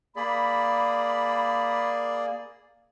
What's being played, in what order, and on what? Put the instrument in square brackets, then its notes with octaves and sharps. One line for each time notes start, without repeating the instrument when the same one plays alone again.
[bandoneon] A#3 G#4 D5 [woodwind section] B5